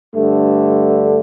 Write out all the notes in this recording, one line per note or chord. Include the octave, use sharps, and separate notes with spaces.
G2 D3 A3